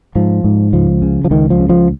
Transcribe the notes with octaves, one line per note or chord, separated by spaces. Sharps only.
G#2 F3
G#2
C#2 F3
C#3
F3
C#2 D#3
F3
C#3
F3